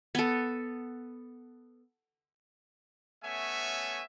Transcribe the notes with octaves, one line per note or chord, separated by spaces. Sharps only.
B3 A4
A3 B3 C#4 C#5 E5 G#5